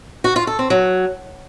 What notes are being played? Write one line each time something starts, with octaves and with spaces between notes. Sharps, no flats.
F#4
F4
A4
C4
F#3